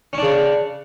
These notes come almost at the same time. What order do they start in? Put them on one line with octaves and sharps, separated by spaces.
C#4 D4 C#3